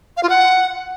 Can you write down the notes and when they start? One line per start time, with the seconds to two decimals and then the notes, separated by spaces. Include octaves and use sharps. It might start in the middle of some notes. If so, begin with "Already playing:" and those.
0.17 F5
0.23 F4
0.30 F#5